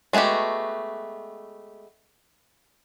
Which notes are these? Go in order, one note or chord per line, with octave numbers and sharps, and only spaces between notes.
G#3 A3 B3 F#4 G4